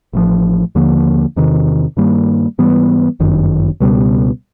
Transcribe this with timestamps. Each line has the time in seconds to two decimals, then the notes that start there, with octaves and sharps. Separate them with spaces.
0.13 A1 A2 F3
0.75 D#2 D3 F3 A#3
1.36 E2 C3 D#3
1.97 G2 D#3 G3 A#3
2.58 G#2 E3 G3 B3
3.20 G1 F#2 D#3
3.80 C#2 B2 G3 B3